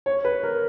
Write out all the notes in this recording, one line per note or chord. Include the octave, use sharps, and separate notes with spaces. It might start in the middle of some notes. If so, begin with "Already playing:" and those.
C#5
B4
A#4